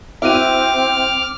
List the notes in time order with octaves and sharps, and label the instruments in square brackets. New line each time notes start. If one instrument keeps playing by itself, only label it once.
[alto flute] C4 [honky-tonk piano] E4 F#4 D#7 [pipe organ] D6 F6